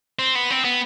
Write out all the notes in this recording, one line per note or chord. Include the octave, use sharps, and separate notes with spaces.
C4
B3
C4
B3